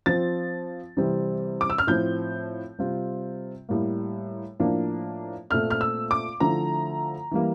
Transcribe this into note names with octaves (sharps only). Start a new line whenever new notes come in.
F3 C4 F4 A6
C3 E3 G3 C4
D6
E6
F6
A2 F3 C4 G6
C3 G3 C4 F4
A2 G3 A#3
A2 F3 A#3 D4
A#2 A3 C4 F6
F6
E6
D6
D3 F3 A3 E4 A#5
E3 G3 A#3